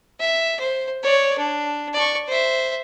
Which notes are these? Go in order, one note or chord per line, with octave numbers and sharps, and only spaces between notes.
E5
C5
C#5 D5
D4
D5 C#6
C5 E5